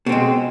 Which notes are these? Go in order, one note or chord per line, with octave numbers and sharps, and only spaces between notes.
B2 G#3 C4